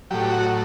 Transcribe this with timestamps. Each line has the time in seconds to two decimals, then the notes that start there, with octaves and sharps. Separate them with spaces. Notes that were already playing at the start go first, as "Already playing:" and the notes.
0.11 A2 F#3 G4
0.30 F#4